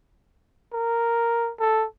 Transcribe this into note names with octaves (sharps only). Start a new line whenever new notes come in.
A#4
A4